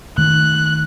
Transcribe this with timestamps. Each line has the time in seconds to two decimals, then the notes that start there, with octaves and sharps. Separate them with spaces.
0.18 D#3 A3 F#6